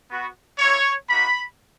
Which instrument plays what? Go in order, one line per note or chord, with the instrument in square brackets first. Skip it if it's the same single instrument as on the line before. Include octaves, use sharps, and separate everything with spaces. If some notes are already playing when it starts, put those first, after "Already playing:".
[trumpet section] B3 F#4
A#3 E4 C#5
A#3 D#4 F#4 B5